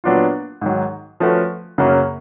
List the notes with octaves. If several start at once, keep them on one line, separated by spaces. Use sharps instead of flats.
A#2 F#3 B3 D4 F4
G#2 D#3 F#3
F3 A3 C#4 F#4 B4
F#2 C#3 F#3 A#3 C#4